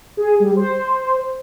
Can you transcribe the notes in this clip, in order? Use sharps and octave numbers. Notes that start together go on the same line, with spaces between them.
G#4
G3
C5